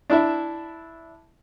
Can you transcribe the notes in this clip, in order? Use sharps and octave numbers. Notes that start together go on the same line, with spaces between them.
D4 E4 E5